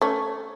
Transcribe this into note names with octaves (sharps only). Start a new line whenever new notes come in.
A3 C#4